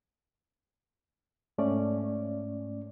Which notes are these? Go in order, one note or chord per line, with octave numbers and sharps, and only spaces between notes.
G#2 A3 C#4 D5